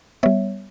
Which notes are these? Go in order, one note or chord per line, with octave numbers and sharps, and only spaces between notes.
G3 B3 C#5 E5